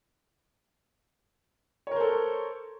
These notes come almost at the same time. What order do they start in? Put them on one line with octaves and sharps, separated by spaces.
C#5 A#4 C5 A4